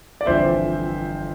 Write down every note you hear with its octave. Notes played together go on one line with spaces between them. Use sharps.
D5
G1 F2 E3 C5 E5